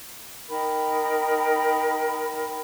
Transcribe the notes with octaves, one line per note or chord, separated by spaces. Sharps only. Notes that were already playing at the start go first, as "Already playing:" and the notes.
D#4 A#4 G5 B5